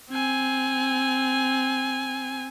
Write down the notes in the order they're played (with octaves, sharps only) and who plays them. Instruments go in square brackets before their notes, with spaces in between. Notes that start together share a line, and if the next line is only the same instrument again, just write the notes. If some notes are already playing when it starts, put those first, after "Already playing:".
[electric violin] C4 G#5